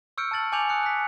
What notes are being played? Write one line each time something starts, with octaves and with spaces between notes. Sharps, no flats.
C#6 E6 F6 G6 C#7 D7
A5 F6 A6 F#7
G#5 D6 G6 C#7 F7 F#7
D#6 F#6 C#7
F#6 B6